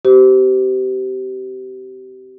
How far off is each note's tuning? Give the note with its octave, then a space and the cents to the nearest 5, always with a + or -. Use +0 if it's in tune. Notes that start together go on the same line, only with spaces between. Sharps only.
C4 -20 G4 -30 C5 -25